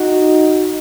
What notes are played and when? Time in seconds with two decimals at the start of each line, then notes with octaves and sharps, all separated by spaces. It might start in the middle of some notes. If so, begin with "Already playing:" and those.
Already playing: D#4 F#4